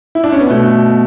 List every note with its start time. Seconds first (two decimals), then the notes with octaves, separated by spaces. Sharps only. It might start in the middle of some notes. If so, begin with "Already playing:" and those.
0.15 E4
0.24 D4
0.32 C#4
0.41 B3
0.50 B2 A3